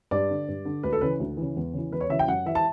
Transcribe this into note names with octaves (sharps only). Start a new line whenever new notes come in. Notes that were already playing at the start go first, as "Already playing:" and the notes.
G2 D5
D3
G2
D3
D2 B4
A4
C#3 E3 B4
D2
C#3 E3
E2
C#3
E3
E2 B4
C#5
C#3 E3 E5
G5
F#2 F#5
E3 E5
A5